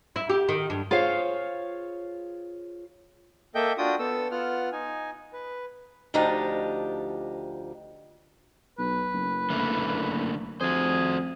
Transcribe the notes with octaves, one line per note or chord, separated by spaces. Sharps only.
E4
G4
D#3
G2
F4 G#4 C5 C#5 F5
A#3 A4 D#5 E5 G5 G6
D4 F4 F#4 G5 D#6
B3 A4 E6
B3 F4 F#5 F6
D#4 G#5
B4
D2 F3 D4 D#4 G4 A#5
B1 B4
F#1
D3 A3 A#3
F2 F#4 G#4 C5